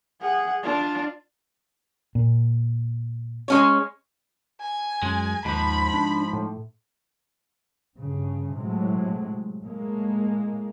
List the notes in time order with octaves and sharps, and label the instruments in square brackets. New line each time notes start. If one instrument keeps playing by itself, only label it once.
[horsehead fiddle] G#4 F#5
D4 F4
[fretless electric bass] A#2
[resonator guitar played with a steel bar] G#3 C#4 C#5
[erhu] G#5
[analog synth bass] F#2 [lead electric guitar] G#3
[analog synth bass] D#2 [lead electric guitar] G#2 F3 [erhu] B5
[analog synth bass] D4
A2
[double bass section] G2 C#3
A2 C3 F#3 G#3
A2 G#3 A#3